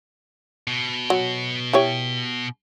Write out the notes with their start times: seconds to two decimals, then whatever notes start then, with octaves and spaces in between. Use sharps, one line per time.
0.67 B2
1.10 F#3
1.73 E4 G4 C#5